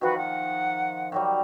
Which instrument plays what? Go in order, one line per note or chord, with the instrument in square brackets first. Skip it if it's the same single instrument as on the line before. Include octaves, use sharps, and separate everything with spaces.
[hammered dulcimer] D#3 F3 [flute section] F#4 B4
[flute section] F#5
[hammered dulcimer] D#3 F#3 G3